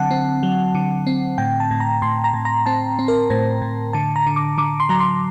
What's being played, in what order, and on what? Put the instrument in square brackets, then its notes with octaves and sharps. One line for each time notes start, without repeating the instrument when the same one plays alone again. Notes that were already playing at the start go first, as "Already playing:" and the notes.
Already playing: [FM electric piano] D3 F#3 C4 F#5 A5
C4
F#3
D3
C4
A2 G5
A5
A2
A#5
A2 C6
A#5
A2
A#5
C4 A5
C4
A#4
A2 C5
A2
D3 A5
A#5
D3
D6
D3 D6
C6
F#3 A#5
C6